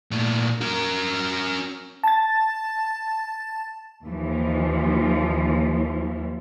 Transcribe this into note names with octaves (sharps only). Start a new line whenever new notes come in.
A#2 A3
C#4 A#4
A5 A6
D#2 E3 F3